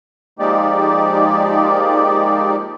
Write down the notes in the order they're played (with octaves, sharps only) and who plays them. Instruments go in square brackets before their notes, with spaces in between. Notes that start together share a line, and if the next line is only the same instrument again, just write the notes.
[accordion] F3 G#3 A#3 D#4 G4 D5